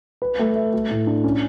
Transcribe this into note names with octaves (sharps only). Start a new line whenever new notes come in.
B4
A3
E5
A3
A2
D4
C#4